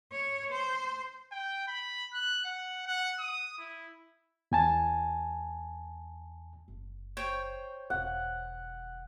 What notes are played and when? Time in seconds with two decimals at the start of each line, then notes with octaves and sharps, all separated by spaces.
0.12 C#5
0.51 C5
1.31 G5
1.67 B5
2.13 F#6
2.44 F#5
2.86 F#5
3.19 D#6
3.58 E4
4.52 E2 G#5 A5
6.68 F#1
7.17 C5 C#5 G5
7.90 E1 D#3 F#5